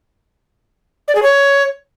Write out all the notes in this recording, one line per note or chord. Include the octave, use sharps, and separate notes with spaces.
D5
G#4
C#5